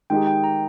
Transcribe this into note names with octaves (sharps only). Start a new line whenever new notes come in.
D#3 G#3 D#4 G4 G5
G5
A#5